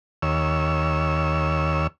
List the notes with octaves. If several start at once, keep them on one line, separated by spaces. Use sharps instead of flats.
D#2 C#5 E6